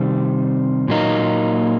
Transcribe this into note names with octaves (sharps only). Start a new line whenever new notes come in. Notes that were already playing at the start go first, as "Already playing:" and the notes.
Already playing: C3 D#3 G3 C4
A#2 F#3 A#3 D#4